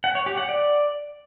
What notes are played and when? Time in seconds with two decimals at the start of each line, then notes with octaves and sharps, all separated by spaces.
0.04 F#5
0.15 C#5
0.26 G4
0.38 F#5
0.49 D5